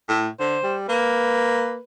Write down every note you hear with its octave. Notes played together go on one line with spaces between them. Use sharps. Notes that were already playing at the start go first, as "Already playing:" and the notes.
A2
D3 C5
G3
A#3 B4